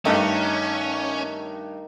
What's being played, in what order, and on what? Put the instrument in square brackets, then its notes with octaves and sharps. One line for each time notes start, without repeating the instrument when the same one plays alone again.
[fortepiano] G2 A3 D#4 [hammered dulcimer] D#3 [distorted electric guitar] C#4